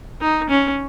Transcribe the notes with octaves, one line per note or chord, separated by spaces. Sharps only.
D#4
C#4